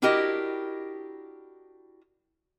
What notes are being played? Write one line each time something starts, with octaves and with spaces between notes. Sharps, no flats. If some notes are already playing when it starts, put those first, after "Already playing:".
D4 E4 F#4 G4 A#4 D#5